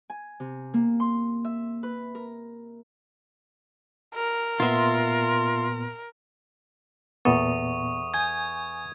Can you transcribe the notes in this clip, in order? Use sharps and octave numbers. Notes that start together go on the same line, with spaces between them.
G#5
C3
A#3
C6
E5
B4
A#4
A#4
A#2 B3 F4 E5 C6
E2 A#2 B3 A4 C#6 D#6
G#5 D#6 G6 G#6